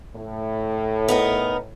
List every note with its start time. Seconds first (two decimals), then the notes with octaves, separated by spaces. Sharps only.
0.16 A2
1.08 B3 D#4 A#4